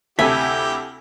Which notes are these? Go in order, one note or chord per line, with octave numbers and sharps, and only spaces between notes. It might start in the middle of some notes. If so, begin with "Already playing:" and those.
D2 C3 E4 G4 A4 E5 G#5